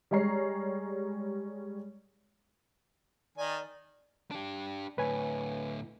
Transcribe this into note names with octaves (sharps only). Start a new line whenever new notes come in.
G3 G#3 C#5 A#5 C7
D#3 D5 G#5
D4 G4
D2 A2 B4 C#5 G#5